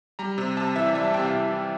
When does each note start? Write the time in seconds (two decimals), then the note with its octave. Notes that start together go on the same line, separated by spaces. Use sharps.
0.19 G3 A#5
0.38 C3
0.57 C3 A5
0.76 E3 E5
0.86 D5
0.95 G3 E5
1.04 A5
1.14 C3 G5
1.23 F5
1.33 C3
1.51 E3